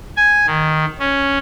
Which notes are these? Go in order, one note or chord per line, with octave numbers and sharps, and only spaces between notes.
G#5
D#3
C#4